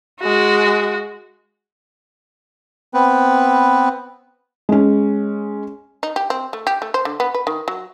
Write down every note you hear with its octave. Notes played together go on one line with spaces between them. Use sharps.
G#3 F#4
B3 C4 B4
G#3 C#4
D#4
G4
C4
A3
G4
A3
C5
D3
B3
B4
D#3
F#3